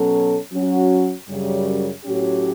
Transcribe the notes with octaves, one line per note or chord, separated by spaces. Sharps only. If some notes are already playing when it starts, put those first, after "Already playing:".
Already playing: B2 F#3 C#4 F#4 A4
F#3 C#4 F#4
F#2 C#3 G3
A2 F#3 C#4 G4